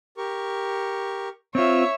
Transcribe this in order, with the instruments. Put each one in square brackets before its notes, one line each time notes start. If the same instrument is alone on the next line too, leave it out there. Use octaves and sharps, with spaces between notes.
[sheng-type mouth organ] G4 A#4 C#6
[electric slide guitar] C4 F4 [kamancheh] C#5 E5